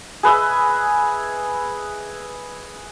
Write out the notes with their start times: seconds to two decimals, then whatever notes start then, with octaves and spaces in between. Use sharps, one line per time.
0.23 G#4 B4 D#5 E5